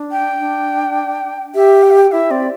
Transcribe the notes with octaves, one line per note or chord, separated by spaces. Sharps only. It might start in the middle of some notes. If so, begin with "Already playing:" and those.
Already playing: D4
G5
D4
G4 E5
G5
E5
G5
E4 E5
C4 D5